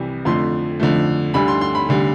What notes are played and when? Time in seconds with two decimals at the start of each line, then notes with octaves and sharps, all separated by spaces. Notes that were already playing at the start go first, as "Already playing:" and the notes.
Already playing: C2 C3 E3 G3
0.25 F2 D3 F3 A3 C6
0.80 F2 D3 F3 A3
1.34 D2 D3 G3 B5
1.48 C6
1.61 C6
1.75 B5
1.89 D2 D3 G3